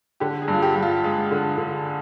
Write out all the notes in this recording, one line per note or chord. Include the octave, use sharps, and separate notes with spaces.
D3 G4
G#4
G2 F4
G4
G2
F4
G#3
D3
D3